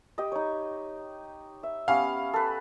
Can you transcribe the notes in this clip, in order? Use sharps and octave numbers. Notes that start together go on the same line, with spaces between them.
G4 D#5
D#4 C#5
E5
B3 C#4 G4 F5
A4 B4